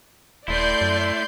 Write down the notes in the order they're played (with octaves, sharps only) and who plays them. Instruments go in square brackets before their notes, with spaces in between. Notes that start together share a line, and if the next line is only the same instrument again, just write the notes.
[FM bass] D#1 [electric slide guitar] A3 E4 [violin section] D5 C6 G6
[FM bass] F#2